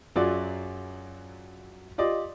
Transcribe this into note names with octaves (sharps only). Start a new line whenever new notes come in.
F#2 F#3 F4 F#4 G#4 D5
F4 G4 D5 D#5